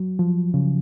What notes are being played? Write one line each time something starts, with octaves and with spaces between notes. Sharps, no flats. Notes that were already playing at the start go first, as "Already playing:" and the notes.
Already playing: F#3
F3
C#3